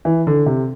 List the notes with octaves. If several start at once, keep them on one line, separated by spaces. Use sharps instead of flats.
E3
D3
C3